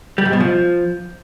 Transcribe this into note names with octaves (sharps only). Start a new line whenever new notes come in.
G3
G#2
B2
F3